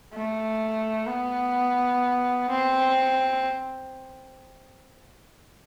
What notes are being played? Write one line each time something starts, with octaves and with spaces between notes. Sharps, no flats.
A3
B3
C4